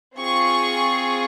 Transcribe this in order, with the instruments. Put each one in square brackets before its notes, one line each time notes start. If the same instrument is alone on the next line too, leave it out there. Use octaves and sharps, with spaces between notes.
[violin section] C4 F4 G#4 C#6